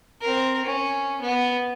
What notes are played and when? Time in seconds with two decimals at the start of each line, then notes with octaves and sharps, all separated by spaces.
0.21 C4 A#4
0.65 C#4
1.21 B3